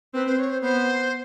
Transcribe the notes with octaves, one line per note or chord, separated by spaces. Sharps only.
C4 B4
C5
C#5
C5
B3 C5